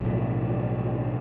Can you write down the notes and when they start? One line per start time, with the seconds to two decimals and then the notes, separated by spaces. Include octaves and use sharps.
0.01 B1 A2 F3 F#3